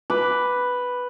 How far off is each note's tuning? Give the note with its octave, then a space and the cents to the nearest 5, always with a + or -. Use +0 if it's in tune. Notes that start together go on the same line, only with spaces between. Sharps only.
B4 +0 D6 +0